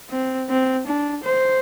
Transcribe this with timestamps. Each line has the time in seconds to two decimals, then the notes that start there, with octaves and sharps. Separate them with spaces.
0.10 C4
0.49 C4
0.86 D4
1.24 C5